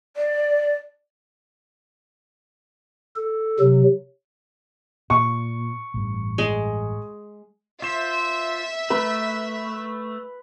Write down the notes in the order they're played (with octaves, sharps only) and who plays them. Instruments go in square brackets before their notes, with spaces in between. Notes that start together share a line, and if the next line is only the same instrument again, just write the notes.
[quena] D5
[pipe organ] A4
C3 F#3
[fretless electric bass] A#2 [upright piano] C#6
[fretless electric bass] A1 G2
[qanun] G#3
[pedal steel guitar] F4 C5 [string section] E5
[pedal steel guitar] A3 [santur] B4